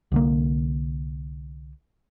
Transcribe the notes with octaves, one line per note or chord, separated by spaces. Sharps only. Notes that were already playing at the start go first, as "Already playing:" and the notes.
C2 D3 A#3